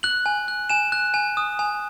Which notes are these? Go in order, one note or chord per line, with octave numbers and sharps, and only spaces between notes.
F#6 F#7
G#5
F#6
G#5 E7
F#6
G#5
D#6
G#5